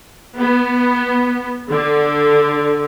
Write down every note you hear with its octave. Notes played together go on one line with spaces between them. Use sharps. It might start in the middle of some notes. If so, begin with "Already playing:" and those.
B3
D3